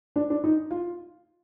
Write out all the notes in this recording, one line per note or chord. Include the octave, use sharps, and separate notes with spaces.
D4
D4
D#4
F4